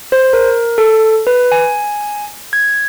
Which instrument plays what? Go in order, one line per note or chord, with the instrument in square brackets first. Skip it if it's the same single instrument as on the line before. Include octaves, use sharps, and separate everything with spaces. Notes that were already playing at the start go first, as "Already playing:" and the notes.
[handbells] C5
A#4
A4
B4
G#5
G#6